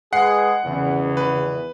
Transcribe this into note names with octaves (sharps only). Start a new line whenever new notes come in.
G#3 G#4 B4 F#5 C7
G#1 E2 C#3
B4